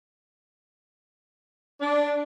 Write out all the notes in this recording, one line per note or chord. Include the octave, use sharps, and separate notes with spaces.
D4